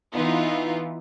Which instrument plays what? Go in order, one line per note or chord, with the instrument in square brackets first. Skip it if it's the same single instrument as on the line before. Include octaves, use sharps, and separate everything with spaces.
[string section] E3 B3 D#4 F4